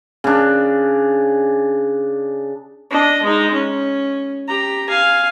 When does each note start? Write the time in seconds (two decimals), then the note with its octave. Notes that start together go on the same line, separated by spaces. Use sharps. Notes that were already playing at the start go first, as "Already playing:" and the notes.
0.24 C#3 D4
2.91 D4 D#5
3.24 G#3 D#4
3.54 C#4
4.49 G4 A#5
4.90 F5 G#5